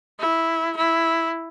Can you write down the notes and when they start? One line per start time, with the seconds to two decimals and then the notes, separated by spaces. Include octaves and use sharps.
0.20 E4
0.76 E4